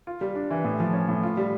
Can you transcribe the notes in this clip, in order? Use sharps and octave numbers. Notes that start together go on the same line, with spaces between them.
F4
G3
D4
E3
A2
F3
C#4
A2
F4
G3